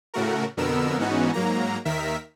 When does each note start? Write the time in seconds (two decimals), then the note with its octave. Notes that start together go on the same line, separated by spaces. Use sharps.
0.14 A2 C#3 A3 F#4 A#4
0.57 F2 B2 D3 B3 A#4 E6
0.98 G#2 E3 B3 C#4 D#4 F#4
1.33 G#2 F#3 A#3 A#5
1.85 D#2 D#3 A#4 E5 B6